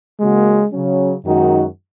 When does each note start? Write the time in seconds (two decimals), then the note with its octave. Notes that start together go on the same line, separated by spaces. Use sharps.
0.20 C#3 G#3 A#3 F#4
0.72 C#3 F#3 C#4
1.24 F#2 D#3 G#3 D#4 F#4